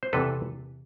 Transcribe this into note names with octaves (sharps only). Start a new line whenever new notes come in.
C5
E2 C3 E3 A4 B4